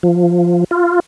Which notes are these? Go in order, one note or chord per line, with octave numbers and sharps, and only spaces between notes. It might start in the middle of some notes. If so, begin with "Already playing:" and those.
F3
F4